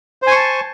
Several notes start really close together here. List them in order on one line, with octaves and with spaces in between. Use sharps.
C5 G#5 C#6 A5